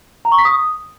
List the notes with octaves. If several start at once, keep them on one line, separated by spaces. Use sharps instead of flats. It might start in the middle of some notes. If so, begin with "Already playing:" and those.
A#5
C#6
B6
D#6